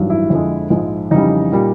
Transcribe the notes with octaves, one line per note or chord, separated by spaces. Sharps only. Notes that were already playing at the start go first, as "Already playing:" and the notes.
Already playing: A1 G2 D#3 F#3
E4
F2 D3 F3 G#3
A#1 G#2 F3 G#3
F2 C#3 E3 G3 D#4
A#2 G3